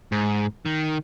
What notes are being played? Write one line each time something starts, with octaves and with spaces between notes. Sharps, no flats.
G#2
D#3